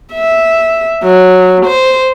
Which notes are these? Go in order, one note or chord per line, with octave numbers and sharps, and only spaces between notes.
E5
F#3
C5